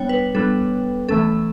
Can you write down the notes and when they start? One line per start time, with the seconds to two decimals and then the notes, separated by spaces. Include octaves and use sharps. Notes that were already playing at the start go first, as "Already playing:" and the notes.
Already playing: G3 B3 D4 C#5 G5
0.09 B4
0.35 G3 B3 D4 A4
1.08 E3 A3 C#4 A4